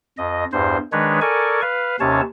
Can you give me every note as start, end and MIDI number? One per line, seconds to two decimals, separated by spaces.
0.18 0.45 41
0.18 0.45 75
0.53 0.77 40
0.53 0.77 43
0.53 0.77 72
0.92 1.20 51
0.92 1.20 56
0.92 1.20 62
0.92 1.20 71
0.92 1.20 73
1.21 1.61 69
1.21 1.61 70
1.21 1.61 74
1.21 1.61 80
1.21 1.61 85
1.62 1.96 71
1.62 1.96 77
2.00 2.21 39
2.00 2.21 48
2.00 2.21 61
2.00 2.21 73
2.00 2.21 81